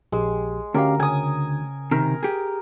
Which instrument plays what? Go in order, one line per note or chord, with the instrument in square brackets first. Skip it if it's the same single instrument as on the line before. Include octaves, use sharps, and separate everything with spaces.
[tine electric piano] A#1 G4 [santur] G#3
[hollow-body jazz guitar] D2 [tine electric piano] C#4 G4 F5 [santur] A#4
[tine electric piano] C#3 [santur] G#5 D#6
[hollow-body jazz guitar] C3 D#3 [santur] A#4
[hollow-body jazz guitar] G4 G#4